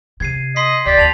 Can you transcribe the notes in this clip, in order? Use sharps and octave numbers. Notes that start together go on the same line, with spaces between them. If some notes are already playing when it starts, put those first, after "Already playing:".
C3 G#6 C7 D#7
D#5 C6 B6 C7
D#2 G4 D5
D#2 A5 F7 F#7